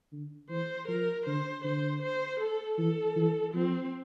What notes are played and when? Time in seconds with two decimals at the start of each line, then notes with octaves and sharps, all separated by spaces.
0.12 D3
0.50 E3 C5
0.88 F3 A#4
1.26 D3 C5
1.64 D3 C5
2.02 C5
2.40 A4
2.78 E3 A4
3.16 E3
3.54 F3 C4